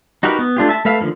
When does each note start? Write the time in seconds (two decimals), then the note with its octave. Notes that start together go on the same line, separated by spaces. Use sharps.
0.23 D#4 F#4 G4 A#4 B4
0.39 B3
0.57 A3 D4 F4 G4
0.69 E5 A5
0.85 A3 B4 E5 F5
1.01 D3 D#3 F3 A#3